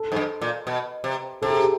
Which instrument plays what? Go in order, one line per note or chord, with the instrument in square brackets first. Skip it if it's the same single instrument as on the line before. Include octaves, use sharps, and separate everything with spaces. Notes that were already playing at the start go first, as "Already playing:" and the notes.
Already playing: [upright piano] A4
[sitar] G#2
G2
A#2
B2
C3
[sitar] C3 [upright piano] A4
[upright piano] G#4
G4